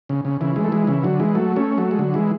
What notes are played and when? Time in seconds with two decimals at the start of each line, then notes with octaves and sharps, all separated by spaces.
0.09 C#3
0.25 C#3
0.41 C#3 E3
0.56 E3 G#3
0.64 A3
0.72 E3 G#3
0.87 C#3 E3
1.03 D3 F#3
1.20 E3 G#3
1.35 F#3 A3
1.56 A3 C#4
1.78 F#3 A3
1.91 G#3
1.99 D3 F#3
2.14 E3 G#3